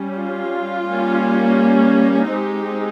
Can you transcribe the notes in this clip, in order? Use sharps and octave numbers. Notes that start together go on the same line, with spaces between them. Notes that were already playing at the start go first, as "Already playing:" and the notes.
Already playing: G3 C#4
F4
G3 A#3 C#4
G#3 C4 D#4 G4